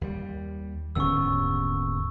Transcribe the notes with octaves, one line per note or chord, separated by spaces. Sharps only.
D#2 G3
D#1 D#2 G#2 D3 B3 C#4 C#6 E6